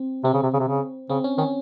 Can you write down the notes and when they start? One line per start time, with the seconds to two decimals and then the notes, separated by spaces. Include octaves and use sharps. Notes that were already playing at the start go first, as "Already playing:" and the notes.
Already playing: C4
0.24 C3 C4
0.34 C#3
0.43 C3
0.53 C#3
0.59 C3
0.68 C#3
1.10 C#3 C4
1.24 C#4
1.38 D#3 C#4